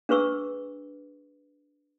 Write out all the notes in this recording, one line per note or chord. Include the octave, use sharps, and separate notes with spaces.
D4 G#4 B4 C#6 E6